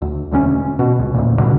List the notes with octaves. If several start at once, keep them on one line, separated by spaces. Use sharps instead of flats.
D2
E1 D2 G3 C#4
B2
C#2
E1 D2 A#2
C#2 G2 B2 D3